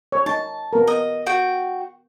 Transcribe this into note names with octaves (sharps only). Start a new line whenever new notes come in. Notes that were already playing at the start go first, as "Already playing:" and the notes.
C#5
D#4 A5
B3 A#4
D#5
F#4 G5